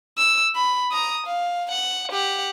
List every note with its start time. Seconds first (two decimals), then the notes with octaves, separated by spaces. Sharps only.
0.18 E6
0.56 B5
0.92 A#5 D#6
1.26 F5
1.71 F#5
2.12 G4 F#5